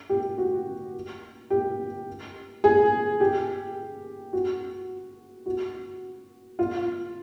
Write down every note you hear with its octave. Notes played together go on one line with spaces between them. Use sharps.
G4
F#4
G4
G#4
G4
F#4
F#4
F4